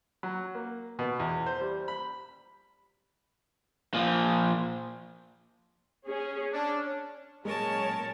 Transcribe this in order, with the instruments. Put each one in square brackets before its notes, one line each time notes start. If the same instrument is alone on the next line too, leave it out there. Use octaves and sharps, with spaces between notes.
[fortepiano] F#3
A#3
B2
E2
C5
G3
B5
[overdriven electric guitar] A#2 F3
[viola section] C#4 G#4
[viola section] C#4 [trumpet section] D4
[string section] A#2 F#3 C#4 [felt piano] G#3 [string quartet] A#4 C#5 A5